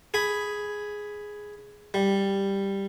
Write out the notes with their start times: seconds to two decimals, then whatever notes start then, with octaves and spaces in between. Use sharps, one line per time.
0.14 G#4 B5
1.94 G3